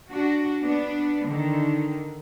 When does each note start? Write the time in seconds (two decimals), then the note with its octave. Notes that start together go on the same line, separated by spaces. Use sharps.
0.10 D4 F#4
0.64 B3 D4
1.28 D3 D#3